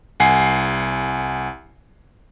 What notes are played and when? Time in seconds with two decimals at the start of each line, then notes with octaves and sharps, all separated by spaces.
0.20 C2 F#5 G#5 C7